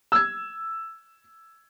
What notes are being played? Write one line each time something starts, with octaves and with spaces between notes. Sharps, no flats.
E6 G#6